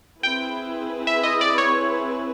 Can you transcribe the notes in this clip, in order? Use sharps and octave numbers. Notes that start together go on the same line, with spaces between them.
C4 E4 G#4 B4 G5
E5
D#5
D5
C#5